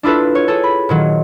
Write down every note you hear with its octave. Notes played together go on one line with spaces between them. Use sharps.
D4 E4 F4 A4 B4
C#5
G#4 A4
B5
A#2 D#3 F#3